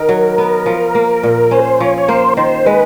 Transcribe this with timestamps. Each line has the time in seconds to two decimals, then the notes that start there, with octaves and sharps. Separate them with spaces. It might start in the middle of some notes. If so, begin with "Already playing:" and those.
Already playing: D#3 D#4 A#4
0.09 F#3
0.38 B3
0.66 F3
0.95 A#3
1.23 A#2
1.51 C#4 C5
1.80 F3 C#5
1.98 C#5
2.08 A#3 C5
2.37 D#3 C5
2.66 G#3 B4